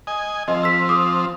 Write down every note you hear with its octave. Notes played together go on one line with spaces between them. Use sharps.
D#5 G#5
F3 C4 D#5
E6 B6
D6 D#6